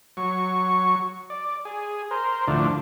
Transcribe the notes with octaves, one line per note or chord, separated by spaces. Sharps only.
F#3 C#6
D5
G#4
A#4 C5
D2 A2 D3 F3 D4